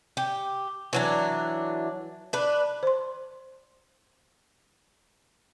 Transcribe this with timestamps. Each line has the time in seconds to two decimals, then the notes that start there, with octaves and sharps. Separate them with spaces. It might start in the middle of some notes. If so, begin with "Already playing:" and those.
0.17 G4
0.93 E3 F#3 D4
2.33 D4 B4
2.83 C5 C6